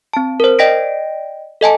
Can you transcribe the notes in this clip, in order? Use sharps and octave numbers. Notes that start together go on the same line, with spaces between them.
C4 A5
A#4 C5
D5 D#5 G5 A#6 B6 D7
A4 D#5 G#5 A5